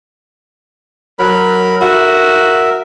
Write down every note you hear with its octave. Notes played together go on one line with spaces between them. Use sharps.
F#3 A#4 B5
F#4 A#4 E5